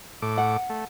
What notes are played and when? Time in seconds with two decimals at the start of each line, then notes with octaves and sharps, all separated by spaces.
0.22 A2 D6
0.38 F#5
0.70 A3